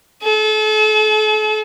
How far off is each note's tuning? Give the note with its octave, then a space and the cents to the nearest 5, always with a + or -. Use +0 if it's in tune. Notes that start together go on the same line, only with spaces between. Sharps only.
A4 -40